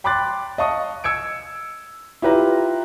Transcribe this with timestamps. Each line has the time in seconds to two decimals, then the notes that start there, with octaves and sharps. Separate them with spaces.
0.04 G5 B5 C6 D6 F#6 A6
0.58 D#5 F5 A5 C#6 D#6
1.04 E6 G#6 C#7 D7
2.22 E4 F4 G4 B4 E5 A#5